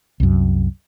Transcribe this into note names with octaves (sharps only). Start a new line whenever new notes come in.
C2 F#2